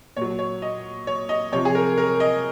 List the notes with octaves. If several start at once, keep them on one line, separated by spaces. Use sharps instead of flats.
A#2 F#3 C#5
C#5
D#5
C#5
D#5
C3 F3 C#5
G#4
A#4
A#4
D#5